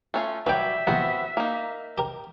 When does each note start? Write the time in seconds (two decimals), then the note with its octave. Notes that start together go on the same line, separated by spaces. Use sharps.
0.14 A3 C#4 F4
0.46 F#3 G3 B4 D5 E5 G5
0.87 A1 D#2 B3 C4 F#4
1.37 A#3 D#4
1.98 G4 A#4